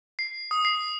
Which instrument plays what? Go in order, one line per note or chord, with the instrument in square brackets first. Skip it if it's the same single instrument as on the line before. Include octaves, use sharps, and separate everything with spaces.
[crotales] C7
D#6
C7